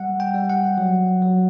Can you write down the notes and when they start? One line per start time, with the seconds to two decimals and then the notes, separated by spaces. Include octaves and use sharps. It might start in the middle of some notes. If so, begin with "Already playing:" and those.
Already playing: G3 F#5
0.20 G5
0.34 G3
0.50 F#5
0.78 F#3
1.22 F#3